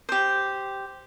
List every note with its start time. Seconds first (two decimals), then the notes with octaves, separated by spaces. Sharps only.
0.09 G4 C5